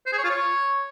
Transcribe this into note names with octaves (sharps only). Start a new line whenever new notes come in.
C5
G#4
C#5
F4
C#5